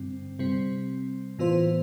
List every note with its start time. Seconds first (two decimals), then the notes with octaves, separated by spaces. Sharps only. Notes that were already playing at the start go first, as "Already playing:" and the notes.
Already playing: G2 D3 G3 C4
0.39 C3 G3 C4
1.39 A2 E3 B3 F4 C5